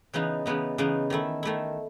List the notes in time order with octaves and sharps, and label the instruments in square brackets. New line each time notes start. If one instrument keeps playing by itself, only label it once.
[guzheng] C#3 E3 B3 D#4
C#3 E3 B3 D#4
C#3 E3 B3 D#4
D#3 A3 E4
D#3 A3 E4